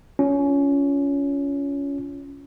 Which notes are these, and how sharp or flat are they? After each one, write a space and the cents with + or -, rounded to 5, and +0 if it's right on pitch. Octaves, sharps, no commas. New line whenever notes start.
C#4 +20 F4 -10